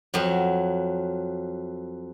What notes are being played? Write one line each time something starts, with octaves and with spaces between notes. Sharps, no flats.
F2 F#3